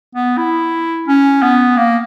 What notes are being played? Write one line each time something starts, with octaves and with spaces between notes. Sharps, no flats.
B3
E4
C#4
B3
A#3